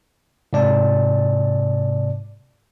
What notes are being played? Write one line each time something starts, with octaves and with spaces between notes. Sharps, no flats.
G#2 C3 D5 A5